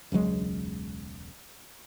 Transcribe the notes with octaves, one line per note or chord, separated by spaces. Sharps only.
E1 C#2 F#3 G#3